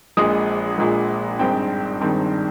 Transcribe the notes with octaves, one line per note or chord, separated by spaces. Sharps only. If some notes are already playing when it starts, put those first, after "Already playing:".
A#1 A#2 G#3 D#6
A#1 A#2 G#3
G#1 G2 D#3 G#3 C4 G5
G#1 G2 D#3 G#3 C4